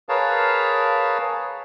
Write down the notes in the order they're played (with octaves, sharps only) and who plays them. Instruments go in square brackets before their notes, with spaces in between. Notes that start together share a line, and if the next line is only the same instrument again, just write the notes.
[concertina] G#4 A#4 B4 C#5 F5 A5